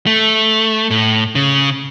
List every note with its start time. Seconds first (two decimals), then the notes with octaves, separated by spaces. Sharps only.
0.07 A3
0.90 A2
1.35 C#3